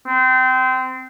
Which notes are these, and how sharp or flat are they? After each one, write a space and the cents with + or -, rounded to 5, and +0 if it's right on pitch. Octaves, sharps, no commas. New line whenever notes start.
C4 -25